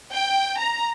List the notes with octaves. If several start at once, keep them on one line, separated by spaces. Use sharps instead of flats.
G5
A#5